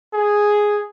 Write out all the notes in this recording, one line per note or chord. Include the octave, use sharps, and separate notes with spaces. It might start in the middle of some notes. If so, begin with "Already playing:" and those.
G#4